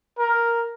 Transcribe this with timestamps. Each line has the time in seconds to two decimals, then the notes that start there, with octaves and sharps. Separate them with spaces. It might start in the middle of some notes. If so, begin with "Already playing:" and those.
0.19 A#4